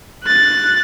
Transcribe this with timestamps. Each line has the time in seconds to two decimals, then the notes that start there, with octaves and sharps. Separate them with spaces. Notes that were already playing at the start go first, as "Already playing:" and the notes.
0.24 F#6 A6